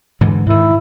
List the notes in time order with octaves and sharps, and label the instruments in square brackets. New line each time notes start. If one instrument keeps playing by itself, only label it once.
[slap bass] G#2 D3 E3
[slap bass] G#2 D#3 [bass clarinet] E4